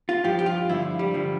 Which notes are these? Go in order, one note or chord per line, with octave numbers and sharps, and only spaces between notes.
F4
G2 F3 G4
G4
F4
G2 D3 F3 E4
G3
D3 F3